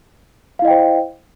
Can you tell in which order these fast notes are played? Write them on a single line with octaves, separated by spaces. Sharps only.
F5 E4 D#5 G5 C5